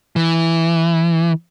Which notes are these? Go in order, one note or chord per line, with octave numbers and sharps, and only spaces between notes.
E3